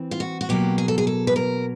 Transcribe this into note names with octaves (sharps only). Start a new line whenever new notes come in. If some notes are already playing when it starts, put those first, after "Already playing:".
Already playing: E3 C4
F4
F#4
F#4
B2 F#3 A#3 G4
G#4
A4
G#4
A4
B4
A#4